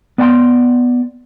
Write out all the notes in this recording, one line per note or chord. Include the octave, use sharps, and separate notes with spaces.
B3 D5 G5 G#5 C6